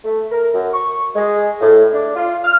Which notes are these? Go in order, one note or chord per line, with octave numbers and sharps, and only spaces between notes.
A3
A#4
F#2
C#6
G#3
A2
D4
F4
F6